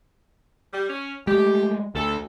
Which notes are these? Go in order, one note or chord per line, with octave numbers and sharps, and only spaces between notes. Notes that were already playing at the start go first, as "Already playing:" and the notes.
G3
C#4
G#3 A3 G4
D2 A4